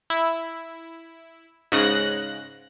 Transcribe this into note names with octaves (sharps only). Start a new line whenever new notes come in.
E4
G#2 C#3 F#6 A#6